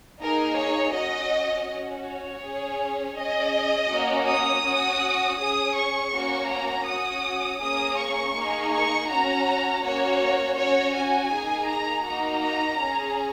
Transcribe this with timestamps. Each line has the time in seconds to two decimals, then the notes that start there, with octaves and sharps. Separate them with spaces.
0.19 A#3 D#4 G#4 A#4
0.57 C#5
0.93 C#4 F#4 D#5
1.68 C#4 F#4
2.04 C#5
2.42 C#4 G#4
3.16 C#4 G#4 D#5
3.90 A#3 C#4 F#4
4.27 D#6
4.65 C#4 F#4
5.38 C#4 G#4 D#6
5.75 C#6
6.12 A#3 C#4 F#4
6.49 A#5
6.86 C#4 F#4 D#6
7.60 A#3 C#4 G#4 D#6
7.97 C#6
8.34 A#3 D#4 G#4
8.72 C#6
9.08 C#4 F#4 A#5
9.83 A#3 C#4 F#4 C#5
10.57 C#4 F#4 C#5
10.94 G#5
11.31 A#3 D#4 G#4
11.68 A#5
12.05 A#3 D#4 F#4 A#5
12.42 A#5
12.79 C#4 G#4